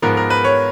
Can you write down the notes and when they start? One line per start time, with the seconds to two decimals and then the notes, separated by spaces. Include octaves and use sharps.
0.02 G#2 F3 B3 A#4
0.17 A#4
0.30 B4
0.44 C#5